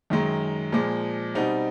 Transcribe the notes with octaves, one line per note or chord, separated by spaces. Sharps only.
F#2 D#3 G#3
A#2 F3 G#3
B2 G3 C4 D#4